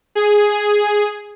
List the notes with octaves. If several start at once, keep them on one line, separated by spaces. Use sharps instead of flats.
G#4